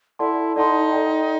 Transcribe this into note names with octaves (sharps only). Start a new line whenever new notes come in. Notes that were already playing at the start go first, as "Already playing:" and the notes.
E4 A4 D5 F#5 A5 C6
D#4 A4 D5 F#5 A5 C6
A4 D5 G5